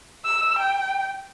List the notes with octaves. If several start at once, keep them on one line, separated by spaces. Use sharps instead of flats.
E6
G5